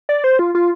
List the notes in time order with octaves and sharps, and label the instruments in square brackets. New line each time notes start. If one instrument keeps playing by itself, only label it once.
[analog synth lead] D5
C5
F4
F4